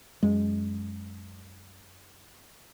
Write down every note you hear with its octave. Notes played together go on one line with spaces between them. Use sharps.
F#2 G#3